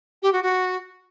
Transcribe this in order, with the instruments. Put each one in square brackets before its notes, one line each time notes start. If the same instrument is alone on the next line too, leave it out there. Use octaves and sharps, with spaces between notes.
[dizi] G4
F#4
F#4